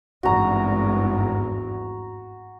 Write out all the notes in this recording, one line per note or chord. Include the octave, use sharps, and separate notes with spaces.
G#1 E2 G2 F#4 A#5